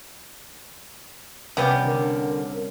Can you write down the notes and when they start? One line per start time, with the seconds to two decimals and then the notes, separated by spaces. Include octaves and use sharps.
1.57 C2 C#3 B3 C#4 G4 D5
1.85 D3 A#4